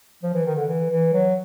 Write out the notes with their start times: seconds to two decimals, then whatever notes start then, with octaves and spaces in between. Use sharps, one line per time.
0.23 F3
0.34 E3
0.46 D#3
0.56 D3
0.68 E3
0.90 E3
1.13 F#3